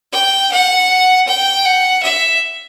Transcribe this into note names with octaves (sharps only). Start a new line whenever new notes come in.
G5
F#5
G5
F#5
E5